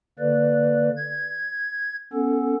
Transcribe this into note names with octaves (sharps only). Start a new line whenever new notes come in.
D3 A#3 B4 D5
G#6
B3 C#4 A4